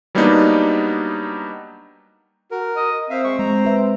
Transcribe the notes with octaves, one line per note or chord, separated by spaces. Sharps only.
F#3 G3 A#3 B3 D4 D#4
F#4 A#4
D#5
C4 E5 F5
G#3 C#6
G#3 A#5
B4 E5